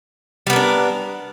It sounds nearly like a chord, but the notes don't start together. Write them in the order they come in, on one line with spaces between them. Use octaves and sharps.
G3 B3 A#4 D4